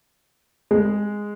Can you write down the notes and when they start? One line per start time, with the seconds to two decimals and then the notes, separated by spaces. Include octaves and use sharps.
0.71 G#3